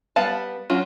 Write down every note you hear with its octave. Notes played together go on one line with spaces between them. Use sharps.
G3 B3 B4 F5 A5
F#3 C#4 F4